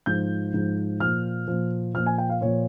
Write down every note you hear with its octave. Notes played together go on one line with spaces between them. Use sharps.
G#2 F3 G6
G#2 F3
A#2 F3 F6
A#2 F3
A#2 F3 F6
G#5
G5
F5
A#2 F3 C#5